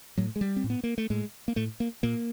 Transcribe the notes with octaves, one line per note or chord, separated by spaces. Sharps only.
A2 F#3
G#3
G3
C4
A2
B3
A#3
A3
A2 G#3
A#3
A2 A3
A#3
A#2 A#3